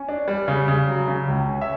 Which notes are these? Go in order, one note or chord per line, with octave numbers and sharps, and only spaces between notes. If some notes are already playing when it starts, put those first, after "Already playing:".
Already playing: C#4
D4
G3
C#3
C#3
F#3
C#3
C#2
C#4
E5